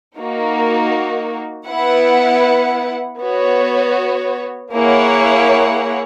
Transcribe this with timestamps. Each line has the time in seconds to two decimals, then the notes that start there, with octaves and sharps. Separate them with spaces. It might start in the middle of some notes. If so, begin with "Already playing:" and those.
0.16 A#3 D#4 F#4
1.68 B3 E4 B4 F#5
3.21 B3 F#4 C#5
4.73 A#3 E4 G#4 C#5 F#5